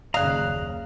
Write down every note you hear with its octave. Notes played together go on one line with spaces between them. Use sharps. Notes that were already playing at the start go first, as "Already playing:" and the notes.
F#1 D#2 C#3 D5 F5 A#5 D#6 F#6